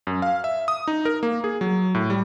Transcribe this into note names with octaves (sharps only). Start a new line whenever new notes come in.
F#2
F5
E5
D#6
D#4
A#4
A#3
G#4
F#3
A2
G3